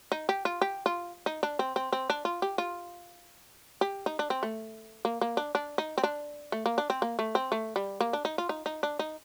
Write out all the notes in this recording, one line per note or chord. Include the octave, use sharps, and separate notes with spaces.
D#4
G4
F4
G4
F4
D#4
D4
C4
C4
C4
D4
F4
G4
F4
G4
D#4
D4
C4
A3
A#3
A#3
D4
D4
D#4
C4
D4
A3
A#3
D4
C4
A#3
A3
C4
A3
G3
A#3
D4
D#4
F4
D#4
D#4
D4
D#4